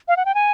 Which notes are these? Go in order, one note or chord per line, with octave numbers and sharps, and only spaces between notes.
F5
F#5
G5
G#5